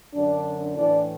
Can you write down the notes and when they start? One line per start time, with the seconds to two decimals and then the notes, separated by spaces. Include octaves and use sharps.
0.12 F#2 D3 D4
0.74 A2 E3 D4